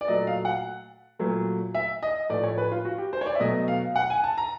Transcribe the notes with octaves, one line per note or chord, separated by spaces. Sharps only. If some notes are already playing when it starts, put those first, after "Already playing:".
D5
A#2 F#3 A3 D#5
F5
F#5
A#2 F#3 A3
E5
D#5
A2 F3 A3 D5
C#5
B4
F4
F#4
G4
C5
C#5
D5
E5
B2 F#3 A3 D#5
F5
F#5
G#5
A5
A#5